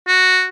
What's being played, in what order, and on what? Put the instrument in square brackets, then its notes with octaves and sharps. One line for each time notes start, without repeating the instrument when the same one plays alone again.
[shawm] F#4